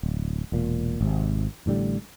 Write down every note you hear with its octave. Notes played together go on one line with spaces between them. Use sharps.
D1
E1 A#2
G#1 C3
A1 A2 D3 G3